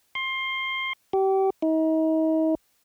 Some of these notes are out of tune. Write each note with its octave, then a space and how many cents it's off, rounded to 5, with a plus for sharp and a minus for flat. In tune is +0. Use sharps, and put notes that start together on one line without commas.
C6 +20
G4 -30
D#4 +40